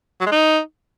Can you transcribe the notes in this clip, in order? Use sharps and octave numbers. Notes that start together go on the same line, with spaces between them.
F#3
G#3
D#4